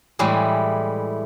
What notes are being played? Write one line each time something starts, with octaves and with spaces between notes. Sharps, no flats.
A2 E3 G3 G#3